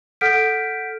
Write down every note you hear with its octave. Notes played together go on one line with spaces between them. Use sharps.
A4 F#5 F6 G6 B6 D7